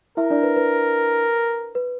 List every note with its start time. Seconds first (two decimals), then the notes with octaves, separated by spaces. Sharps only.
0.17 E4 A#4 E5
0.31 D4 D5
0.43 B4
0.56 B4
1.75 B4